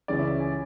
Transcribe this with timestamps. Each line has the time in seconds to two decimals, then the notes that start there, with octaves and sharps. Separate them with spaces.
0.08 C#2 C#3 E3 G#3 C#4 D5
0.19 E5
0.40 G#5